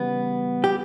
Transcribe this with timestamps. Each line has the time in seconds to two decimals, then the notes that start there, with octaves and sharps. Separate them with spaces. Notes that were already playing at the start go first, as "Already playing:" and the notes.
Already playing: C#3 E3 G3 B3
0.64 G4